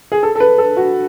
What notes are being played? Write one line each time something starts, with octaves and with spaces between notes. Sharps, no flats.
G#4
A4
A4
B4
A4
F#4